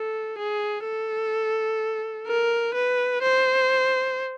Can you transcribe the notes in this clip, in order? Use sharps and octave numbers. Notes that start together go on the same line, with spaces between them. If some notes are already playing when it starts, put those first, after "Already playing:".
Already playing: A4
G#4
A4
A#4
B4
C5